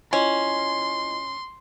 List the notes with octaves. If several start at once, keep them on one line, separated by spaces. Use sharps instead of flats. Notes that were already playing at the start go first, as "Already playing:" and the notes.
C#4 E4 F4 D#5 C6